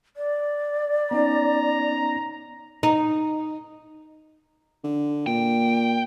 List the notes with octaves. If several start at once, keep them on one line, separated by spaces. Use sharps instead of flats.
D5
B3 C#4 D#4 A#5
D#4
D3
A#2 G5